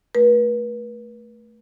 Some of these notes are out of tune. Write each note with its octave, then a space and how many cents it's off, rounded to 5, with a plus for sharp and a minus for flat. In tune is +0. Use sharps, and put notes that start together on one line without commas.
A3 +0 B4 -40